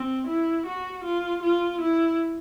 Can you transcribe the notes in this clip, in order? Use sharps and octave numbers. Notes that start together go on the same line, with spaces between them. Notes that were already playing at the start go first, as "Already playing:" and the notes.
Already playing: C4
E4
F#4
F4
F4
E4